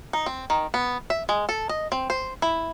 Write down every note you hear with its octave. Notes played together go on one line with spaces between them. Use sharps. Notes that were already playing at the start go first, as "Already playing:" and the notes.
D#4
C4
D#3
B3
E5
G#3
A4
D#5
C4
C5
E4